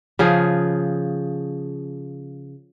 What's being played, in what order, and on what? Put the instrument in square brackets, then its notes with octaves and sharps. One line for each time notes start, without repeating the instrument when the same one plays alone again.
[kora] C#3 F3 G#4